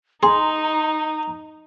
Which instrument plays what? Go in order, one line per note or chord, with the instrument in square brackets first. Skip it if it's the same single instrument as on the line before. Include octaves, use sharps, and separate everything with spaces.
[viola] D#4 [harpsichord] G#4 [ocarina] A#5 [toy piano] C6